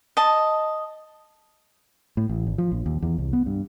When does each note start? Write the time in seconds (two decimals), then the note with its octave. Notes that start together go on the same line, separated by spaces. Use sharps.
0.17 D#5 A5
2.17 A2
2.29 A1
2.47 G#1
2.58 F3
2.71 A#1
2.86 D#2
3.02 E2
3.18 C2
3.33 B3
3.46 G2